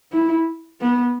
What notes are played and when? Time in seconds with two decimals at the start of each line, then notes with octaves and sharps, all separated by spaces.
0.12 E4
0.80 B3